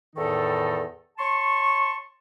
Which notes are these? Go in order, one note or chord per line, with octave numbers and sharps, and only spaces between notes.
E2 A2 D#3 D#4 A4
C#5 A5 C6 C#6